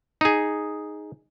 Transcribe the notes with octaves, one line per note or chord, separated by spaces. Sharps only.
D#4 G#4